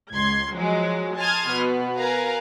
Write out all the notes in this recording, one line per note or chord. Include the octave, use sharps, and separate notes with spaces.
C#2 C6 G#6
F3 F#3 G#3
G#5 A5 C6 D#6 F6 G#6
B2 B3
A#4 B4 F5 G#5 A#5